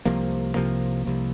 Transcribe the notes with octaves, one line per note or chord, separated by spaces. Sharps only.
C2 C3 F3 A#3
C2 C3 F3 A#3
C2 C3 F3 A#3